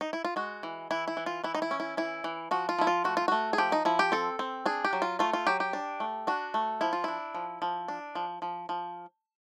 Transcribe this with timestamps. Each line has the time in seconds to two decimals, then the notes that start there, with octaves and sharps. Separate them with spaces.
0.01 D#4
0.13 E4
0.25 F4
0.36 G#3 F#4
0.63 E3
0.91 E3 E4
1.08 E4
1.17 E3
1.26 F4
1.44 E3 E4
1.55 D#4
1.62 E4
1.71 C#4
1.80 E4
1.97 E3 E4
2.24 E3
2.51 F3 F#4
2.69 F4
2.79 F3 E4
2.87 F4
3.04 A3 F#4
3.17 F4
3.28 A3 F#4
3.53 G#4
3.58 F3 G4
3.72 D#4
3.85 F3 E4
3.99 G4
4.12 C4 A4
4.39 C4
4.66 D4 G#4
4.85 G4
4.93 F#3
5.02 F4
5.19 A3 F4
5.33 F4
5.47 F#3 G4
5.60 G4
5.73 D4
6.00 A3
6.27 D4 F#4
6.54 A3
6.81 F3 E4
6.93 F4
7.04 D4 E4
7.35 F3
7.62 F3
7.88 D4
8.15 F3
8.42 F3
8.69 F3